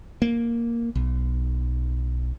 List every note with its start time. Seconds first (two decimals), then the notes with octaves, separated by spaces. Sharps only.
0.22 A#3
0.95 B1